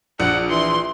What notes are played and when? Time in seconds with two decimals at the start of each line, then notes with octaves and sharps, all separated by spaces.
0.20 A#1 F#5
0.50 E3 C6